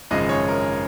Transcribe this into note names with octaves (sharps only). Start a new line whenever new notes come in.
G#1 F#2 C#3 F3 G#3 D#5
C#5
A#4